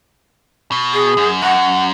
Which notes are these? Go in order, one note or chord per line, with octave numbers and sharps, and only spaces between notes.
B2
G#4
F#2
F#2 F#5